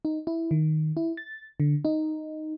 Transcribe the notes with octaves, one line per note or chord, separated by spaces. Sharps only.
D#4
E4
D#3
E4
A6
D3
D#4